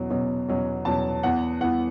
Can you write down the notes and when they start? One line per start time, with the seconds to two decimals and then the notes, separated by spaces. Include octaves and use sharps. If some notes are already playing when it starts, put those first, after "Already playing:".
Already playing: E2 B2 F#3 C#4
0.10 E2 B2 F#3 C#4
0.48 E2 B2 F#3 C#4
0.85 E2 B2 F#3 C#4 A5
1.23 E2 E3 B3 F#5
1.60 E2 E3 B3 F#5